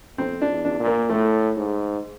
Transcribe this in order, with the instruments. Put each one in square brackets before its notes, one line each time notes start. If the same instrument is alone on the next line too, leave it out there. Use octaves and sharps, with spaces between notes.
[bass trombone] F2 [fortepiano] C4
[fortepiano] D4
[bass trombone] E2
[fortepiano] D4
[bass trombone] A#2
[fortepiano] A#3
[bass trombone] A2 [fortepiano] A3
[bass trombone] G#2